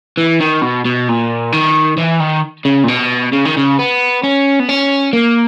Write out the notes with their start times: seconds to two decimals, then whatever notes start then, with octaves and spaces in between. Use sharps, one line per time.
0.17 E3
0.41 D#3
0.62 B2
0.85 B2
1.08 A#2
1.52 D#3
1.97 E3
2.20 D#3
2.65 C#3
2.84 A#2
2.88 B2
3.33 C#3
3.45 D#3
3.57 C#3
3.79 B3
4.23 C#4
4.60 B3
4.69 C#4
5.13 A#3